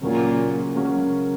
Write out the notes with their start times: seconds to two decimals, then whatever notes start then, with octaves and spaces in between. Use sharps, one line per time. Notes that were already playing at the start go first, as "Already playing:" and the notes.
0.01 A#2 C#3 F#3 A#3 C#4
0.76 C#3 F#3 A#3 C#4